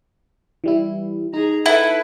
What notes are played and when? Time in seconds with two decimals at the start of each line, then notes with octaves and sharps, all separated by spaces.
0.64 E3 G3 E4
1.34 D#4 G#4 A#5
1.66 E4 A4 B4